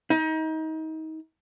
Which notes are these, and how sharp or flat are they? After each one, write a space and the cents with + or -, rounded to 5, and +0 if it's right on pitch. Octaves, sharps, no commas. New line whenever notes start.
D#4 +30